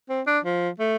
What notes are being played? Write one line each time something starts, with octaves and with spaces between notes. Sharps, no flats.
C4
D4
F3
A3